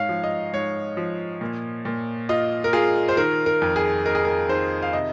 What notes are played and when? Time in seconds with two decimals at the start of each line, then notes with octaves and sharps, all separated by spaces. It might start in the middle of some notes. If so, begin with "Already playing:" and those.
Already playing: G#2 C#5 F5
0.09 F3
0.24 D#5
0.53 G#2 C#5
0.97 F3
1.41 A#2
1.85 A#2
2.29 F4 D#5
2.64 A#4
2.73 F4 G#4
3.09 C5
3.17 D#3 A#4
3.46 A#4
3.62 F2
3.76 G#4
4.06 D#4 A#4
4.15 G#4
4.25 A#4
4.49 D#3 C5
4.82 F5
4.93 C3 D#5